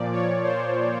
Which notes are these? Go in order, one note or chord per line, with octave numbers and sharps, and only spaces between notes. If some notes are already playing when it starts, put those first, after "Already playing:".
Already playing: A#2 F3 D5
C#5
C5